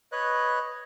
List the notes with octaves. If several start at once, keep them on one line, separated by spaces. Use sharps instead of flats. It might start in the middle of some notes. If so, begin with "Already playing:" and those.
B4 C#5 D#5 F#6